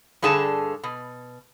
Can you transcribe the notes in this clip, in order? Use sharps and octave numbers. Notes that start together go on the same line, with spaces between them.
G2 D3 G#4 A4 A5
B2